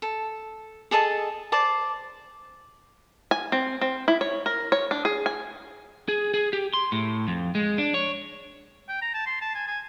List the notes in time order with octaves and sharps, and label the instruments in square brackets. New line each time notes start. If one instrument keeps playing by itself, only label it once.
[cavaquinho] A4
G#4 A4 D#5 A5
C5 D5 A5
[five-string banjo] G#5
C4
C4
E4
C#5
A#4
C#5
D4
G#4
G#5
[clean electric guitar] G#4
G#4
G4
C6
A2
F2
G#3
D4
C#5
[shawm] G5
A#5
A5
C6
A5
G#5
G#5